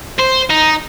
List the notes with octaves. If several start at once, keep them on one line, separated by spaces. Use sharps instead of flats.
C5
D#4